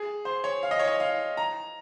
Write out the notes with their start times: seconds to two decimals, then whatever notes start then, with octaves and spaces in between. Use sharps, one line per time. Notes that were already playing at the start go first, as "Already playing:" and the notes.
Already playing: G#4
0.25 C5
0.44 C#5
0.63 F5
0.71 D#5
0.79 C#5
0.87 D#5
1.00 F5
1.37 A#5